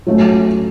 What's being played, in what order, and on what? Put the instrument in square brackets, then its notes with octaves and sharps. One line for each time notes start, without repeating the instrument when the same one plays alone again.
[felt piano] F#3 A3 C#4